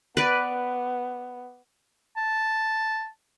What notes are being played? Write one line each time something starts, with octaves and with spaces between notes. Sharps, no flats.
B3 B4 D5
A5